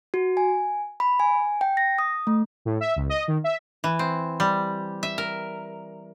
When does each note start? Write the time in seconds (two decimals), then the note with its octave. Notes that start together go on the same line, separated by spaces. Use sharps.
0.14 F#4
0.37 G#5
1.00 B5
1.20 G#5
1.61 G5
1.77 A#6
1.99 D#6
2.27 A3
2.65 A2
2.80 E5
2.96 C#2
3.09 D#5
3.28 D#3
3.44 E5
3.84 E3
3.99 C4
4.40 G3
5.03 E5
5.18 A#4